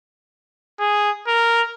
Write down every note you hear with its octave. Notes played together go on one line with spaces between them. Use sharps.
G#4
A#4